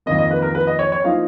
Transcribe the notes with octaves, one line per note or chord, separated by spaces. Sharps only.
F2 D#3 A#3 D#5
D#5
B4
A#4
B4
D#5
C#5
C#5
F3 A#3 D#4 F5